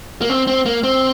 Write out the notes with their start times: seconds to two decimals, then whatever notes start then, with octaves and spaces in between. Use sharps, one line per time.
0.21 A#3
0.30 C4
0.47 C4
0.66 A#3
0.83 C4